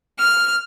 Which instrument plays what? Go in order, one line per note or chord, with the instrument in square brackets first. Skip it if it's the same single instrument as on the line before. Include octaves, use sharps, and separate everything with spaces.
[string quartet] F6